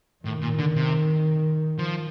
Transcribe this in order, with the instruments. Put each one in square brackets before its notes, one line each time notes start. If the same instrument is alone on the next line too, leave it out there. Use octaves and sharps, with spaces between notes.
[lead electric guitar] A2 [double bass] D#3
[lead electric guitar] A#2
D3
C3
F3